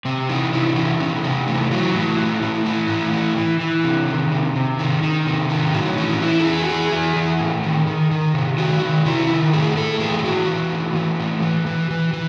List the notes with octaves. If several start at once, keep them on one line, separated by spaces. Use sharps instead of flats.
C3 C4
E3 D#4
C3 E4
E3 C#4
C3 C#4
C3 D#4
E3 A3
E3 F#3
A2 E3
A2
A2
E3
A2
E3
E3
E3
C3
D#3
C3
C3
D#3
D#3
C3
D#3
A2 F#3
E3 C#4
E3 E4
A4
E3 G#4
F#4
E3 G#4
E3
E3
A2
D#3
D#3
D#3
C3
D#3 F#4
D#3
C3 E4
D#3
A2 G#4
A2 A4
E3 G#4
G#4
E3 F#4
E3
A2
E3
A2
E3
E3
E3
E3